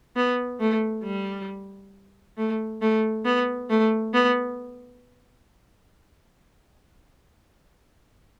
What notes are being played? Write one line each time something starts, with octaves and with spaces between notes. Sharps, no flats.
B3
A3
G3
A3
A3
B3
A3
B3